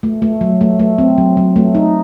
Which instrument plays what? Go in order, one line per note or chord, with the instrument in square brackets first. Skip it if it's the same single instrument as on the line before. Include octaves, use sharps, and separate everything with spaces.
[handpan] A3
A3
F#3
A3
A3
C4
F#3
F#3
A3
D#4